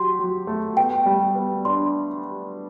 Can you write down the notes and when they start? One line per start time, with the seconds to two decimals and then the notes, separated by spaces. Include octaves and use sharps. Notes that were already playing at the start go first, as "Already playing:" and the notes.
Already playing: F#3 G4 C6
0.19 F#3
0.47 A3
0.77 B3 G5
1.06 G3
1.35 B3
1.65 D4 C6